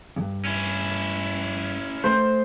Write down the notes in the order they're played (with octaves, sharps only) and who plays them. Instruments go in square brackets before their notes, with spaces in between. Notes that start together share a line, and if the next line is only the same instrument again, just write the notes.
[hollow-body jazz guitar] E2 G2
[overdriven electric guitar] C#4 E4
[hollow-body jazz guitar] A3 [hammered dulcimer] C5